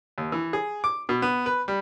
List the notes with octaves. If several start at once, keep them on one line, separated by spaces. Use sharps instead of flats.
D#2
E3
G#4
D6
B2
B3
B4
G3